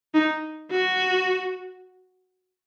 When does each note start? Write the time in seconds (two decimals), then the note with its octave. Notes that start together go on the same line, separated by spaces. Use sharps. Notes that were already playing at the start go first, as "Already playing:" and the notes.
0.14 D#4
0.71 F#4